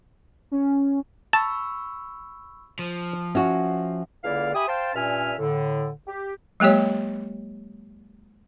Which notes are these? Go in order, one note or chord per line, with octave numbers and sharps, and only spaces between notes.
C#4
A5 B5 C#6 E6
F3
C#4 F#4 E5 F#5
C#2 D3 A#3 E4 D5 F5
G4 E5 G#5 B5 D#6
C5 F5 G5 A5
G2 A#2 C#4 E5 G#5 F6
A2 D3
G4
F#3 G#3 A#3 G4 C#5